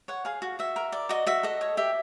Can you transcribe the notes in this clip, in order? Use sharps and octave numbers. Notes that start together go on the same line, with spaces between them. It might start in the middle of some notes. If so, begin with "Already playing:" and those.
C#5 F#5
G#4 F5
F#4
F#4 E5
A#4
D5
F#4 D#5
F#4 E5
A4 D#5
C#5
G4 E5